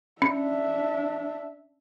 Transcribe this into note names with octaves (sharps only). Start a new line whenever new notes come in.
C#4 D4 E5